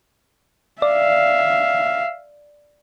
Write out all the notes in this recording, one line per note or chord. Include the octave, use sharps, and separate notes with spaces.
D5 E5 F5